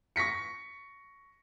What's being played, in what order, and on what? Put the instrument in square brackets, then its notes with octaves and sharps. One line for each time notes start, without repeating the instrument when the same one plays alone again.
[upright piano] C#6 A#6 B6 C#7